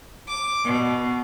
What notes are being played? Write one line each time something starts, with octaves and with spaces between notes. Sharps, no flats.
D6
B2